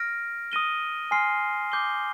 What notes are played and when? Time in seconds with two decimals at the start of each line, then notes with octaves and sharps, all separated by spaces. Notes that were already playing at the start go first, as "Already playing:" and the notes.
Already playing: F6 A#6 D7
0.52 D#6 A#6 D#7 G7
1.11 G#5 C6 F6 C7
1.72 D6 G6 C7 G7